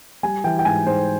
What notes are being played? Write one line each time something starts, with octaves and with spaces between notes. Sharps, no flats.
G3 G#5
E3 G5
G5
G#2 G#5
G#2 C5